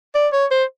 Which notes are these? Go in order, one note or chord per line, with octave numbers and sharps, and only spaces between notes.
D5
C#5
C5